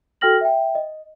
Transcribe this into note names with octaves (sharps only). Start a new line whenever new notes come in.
F#4 A4 G5 F6 A#6 F#7
E5 G5
D#5